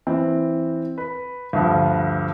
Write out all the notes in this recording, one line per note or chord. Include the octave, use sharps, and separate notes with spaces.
E3 C4
B4
D2 G2 F3